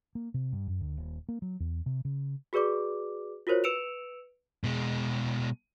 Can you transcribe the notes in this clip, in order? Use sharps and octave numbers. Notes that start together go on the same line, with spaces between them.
A#3
C3
G2
F#2
D2
D#1
A#3
F#3
E2
C3
C#3
F#4 G#4 B4 D5 D6
F4 F#4 A#4 C5 C#5
B4 E6 C#7 D7 E7 F7
B2 G#3